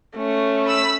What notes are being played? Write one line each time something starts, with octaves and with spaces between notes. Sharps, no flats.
A3 C#4
B5 E6 B6